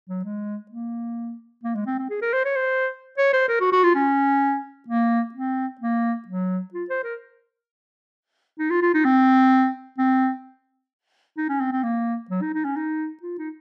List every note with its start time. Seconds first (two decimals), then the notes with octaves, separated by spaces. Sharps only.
0.09 F#3
0.24 G#3
0.71 A#3
1.64 A#3
1.75 G#3
1.87 C4
1.98 C4
2.10 G#4
2.22 A#4
2.33 C5
2.45 C#5
2.56 C5
3.18 C#5
3.33 C5
3.49 A#4
3.61 F#4
3.72 F#4
3.84 F4
3.95 C#4
4.88 A#3
5.34 C4
5.81 A#3
6.28 F#3
6.74 F4
6.89 C5
7.04 A#4
8.59 D#4
8.70 F4
8.82 F4
8.94 D#4
9.05 C4
9.98 C4
11.37 D#4
11.49 C#4
11.61 C4
11.72 C4
11.83 A#3
12.30 F#3
12.42 D#4
12.54 D#4
12.65 C#4
12.76 D#4
13.23 F4
13.38 D#4